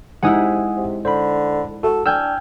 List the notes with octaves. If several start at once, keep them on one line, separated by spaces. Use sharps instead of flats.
C3 G#3 D#4 E4 F#5 G#5 D#6
C3
D3 C5 B5
F#4 A4
D4 G5 G#5 E6 F6 G6